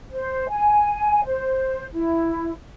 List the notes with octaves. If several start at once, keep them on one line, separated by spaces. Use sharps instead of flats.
C5
G#5
C5
E4